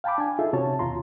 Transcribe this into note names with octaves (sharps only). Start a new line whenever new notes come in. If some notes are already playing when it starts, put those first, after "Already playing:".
F5 G5 A5 B5 D6
D4 G#5
D#4 F4 G#4 A4 E5
C3 C#4 F#4 C#5 A5
D#2 B2 F4 A#5 C6